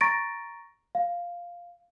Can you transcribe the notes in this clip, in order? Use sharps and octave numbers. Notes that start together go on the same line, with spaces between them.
A#5 C#6 A6 A#6 D7
F5